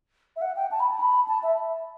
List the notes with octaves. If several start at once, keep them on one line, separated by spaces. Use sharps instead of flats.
E5
F#5
G5
A5
B5
A5
B5
A5
E5